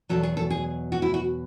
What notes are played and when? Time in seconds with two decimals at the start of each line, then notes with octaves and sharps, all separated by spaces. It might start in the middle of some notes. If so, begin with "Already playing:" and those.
0.09 E2 B2 F#3 A4
0.23 G#4
0.37 A4
0.50 G#4
0.92 F#4
1.02 E4
1.14 F#4